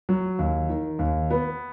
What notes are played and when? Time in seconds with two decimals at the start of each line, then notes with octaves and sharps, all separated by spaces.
0.09 F#3
0.39 D#2
0.69 D#3
0.99 D#2
1.30 B3